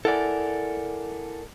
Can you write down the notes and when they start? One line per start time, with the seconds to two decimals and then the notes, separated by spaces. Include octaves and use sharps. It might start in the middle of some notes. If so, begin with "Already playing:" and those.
0.05 E4 A4 A#4 D5 F#5 G#5